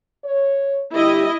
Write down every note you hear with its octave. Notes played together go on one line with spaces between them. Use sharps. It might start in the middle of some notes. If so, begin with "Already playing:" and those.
C#5
D3 G3 E4 G4 D#5